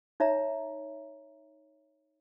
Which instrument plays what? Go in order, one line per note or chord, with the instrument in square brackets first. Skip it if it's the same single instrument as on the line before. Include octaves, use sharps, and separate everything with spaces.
[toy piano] D#4 C#5 E5 A#5